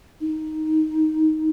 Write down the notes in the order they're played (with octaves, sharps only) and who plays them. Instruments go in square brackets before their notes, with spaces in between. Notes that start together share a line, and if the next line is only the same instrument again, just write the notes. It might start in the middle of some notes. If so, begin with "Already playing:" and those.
[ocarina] D#4